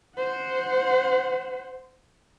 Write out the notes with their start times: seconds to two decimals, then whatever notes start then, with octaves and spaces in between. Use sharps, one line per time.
0.18 C5 F#5